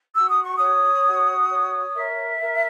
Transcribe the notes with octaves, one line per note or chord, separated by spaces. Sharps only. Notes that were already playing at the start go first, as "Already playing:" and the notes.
F#4 E6
D#6
C#6
C#5 D#6
F#4
C#5
A#4 E5
A#4